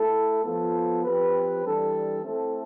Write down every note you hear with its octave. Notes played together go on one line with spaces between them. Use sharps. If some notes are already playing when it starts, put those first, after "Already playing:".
Already playing: A3 E4 A4
F3 B3 F4 A4
F3 C4 G4 B4
E3 G3 D4 A4
A3 C4 E4 A4